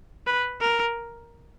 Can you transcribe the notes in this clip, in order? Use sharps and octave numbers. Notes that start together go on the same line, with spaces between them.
B4
A#4